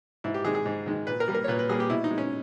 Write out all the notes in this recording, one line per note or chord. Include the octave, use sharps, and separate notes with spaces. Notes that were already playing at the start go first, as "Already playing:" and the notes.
G#2 E4
G4
D#3 G#3 G#4
G#4
G#2
D#3 G#3
A#2 B4
A#4
G3 A#3
A#4
C#5
A#2 B4
B4
G3 A#3 G#4
G4
B2 E4
D#4
G#3
C#4